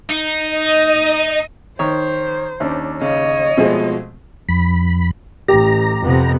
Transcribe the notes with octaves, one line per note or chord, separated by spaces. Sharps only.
D#4
D#5
D#3 C5 C#5
D#2 C#4 D4
C#3 C#5 D#5
B2 F3 G#3 A3 C4 G#4
F2 B5
A1 G4 A#5
F2 C3 B3